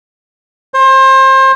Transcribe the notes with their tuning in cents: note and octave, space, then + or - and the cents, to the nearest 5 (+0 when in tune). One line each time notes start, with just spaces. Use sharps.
C5 +30